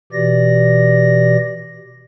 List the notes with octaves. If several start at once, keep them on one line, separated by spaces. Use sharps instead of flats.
B2 E3 G4 D5 A#6